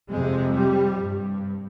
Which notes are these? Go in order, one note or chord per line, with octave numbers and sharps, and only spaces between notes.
F2 C3 G#3
G3
G2